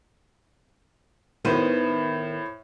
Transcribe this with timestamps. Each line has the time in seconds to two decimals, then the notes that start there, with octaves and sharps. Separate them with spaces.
1.45 A2 D#3 B3 C5 D#7